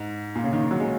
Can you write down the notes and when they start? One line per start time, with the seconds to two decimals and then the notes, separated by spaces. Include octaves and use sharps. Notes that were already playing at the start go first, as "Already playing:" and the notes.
Already playing: G#2
0.35 A#2
0.44 C#3
0.53 D#3
0.63 D#3
0.71 F#3
0.80 G#3